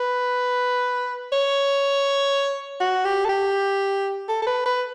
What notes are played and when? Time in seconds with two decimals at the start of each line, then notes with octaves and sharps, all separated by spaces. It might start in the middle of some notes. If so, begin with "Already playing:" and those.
Already playing: B4
1.33 C#5
2.81 F#4
3.05 G4
3.25 A4
3.29 G4
4.29 A4
4.42 A4
4.47 B4
4.66 B4